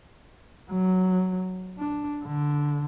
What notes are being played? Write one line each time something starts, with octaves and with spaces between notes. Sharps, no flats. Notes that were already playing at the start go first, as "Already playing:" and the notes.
F#3
D4
D3